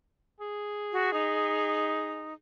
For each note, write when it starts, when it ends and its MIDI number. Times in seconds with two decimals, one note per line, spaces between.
0.40 2.34 68
0.93 1.13 66
1.14 2.33 63